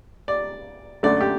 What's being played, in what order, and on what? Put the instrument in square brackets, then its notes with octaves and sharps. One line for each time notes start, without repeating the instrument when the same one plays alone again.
[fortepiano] D5
F#2 D3 A3 D5
G4